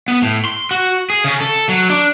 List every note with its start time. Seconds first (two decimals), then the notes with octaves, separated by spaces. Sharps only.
0.08 B3
0.22 A2
0.45 C6
0.71 F#4
1.10 G#4
1.24 C#3
1.40 A4
1.69 F#3
1.90 D4